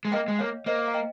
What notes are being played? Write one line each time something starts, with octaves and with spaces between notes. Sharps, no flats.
G#3
A#3 D#5 G5
G#3
A#3 C#5 F5
A#3 C5 D#5
F5
D#5 G5